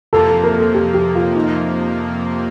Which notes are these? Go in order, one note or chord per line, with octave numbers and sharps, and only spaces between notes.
F2 C3 F3 A#3 A4
A4
A#4
A4
G4
G4
F4
D#4